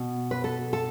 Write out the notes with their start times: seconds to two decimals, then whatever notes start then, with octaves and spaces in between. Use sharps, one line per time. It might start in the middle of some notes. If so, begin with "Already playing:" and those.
Already playing: B2
0.31 B4
0.44 A4
0.73 A4